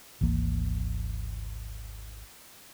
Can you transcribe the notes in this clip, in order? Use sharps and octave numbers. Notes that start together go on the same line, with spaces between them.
G#1 D2 E3 A#3